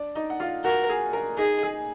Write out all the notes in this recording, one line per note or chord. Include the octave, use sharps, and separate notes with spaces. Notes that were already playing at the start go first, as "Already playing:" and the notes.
Already playing: D4 D5
D#4 D#5
F#5
F4 F5
F#4 A#4 F#5
G#4 G#5
A#4 A#5
D#4 G#4 D#5
G#4 G#5